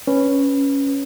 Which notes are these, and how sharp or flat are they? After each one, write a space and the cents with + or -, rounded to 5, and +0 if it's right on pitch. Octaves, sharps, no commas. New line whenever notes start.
C#4 +0 B4 +0